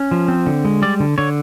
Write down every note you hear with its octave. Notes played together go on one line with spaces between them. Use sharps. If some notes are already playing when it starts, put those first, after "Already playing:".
Already playing: C#4
F3
C4
D3
G#3
G3 D5
D3
D3 C#5